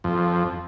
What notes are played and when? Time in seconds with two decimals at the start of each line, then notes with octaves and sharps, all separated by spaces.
0.04 F2